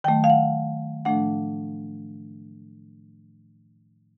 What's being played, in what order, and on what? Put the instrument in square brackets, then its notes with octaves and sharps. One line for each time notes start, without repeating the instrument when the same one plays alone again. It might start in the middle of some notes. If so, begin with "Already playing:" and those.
[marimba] D#3 F#3 A3 G5
F5
F#5
A2 F3 A3 D4 F#5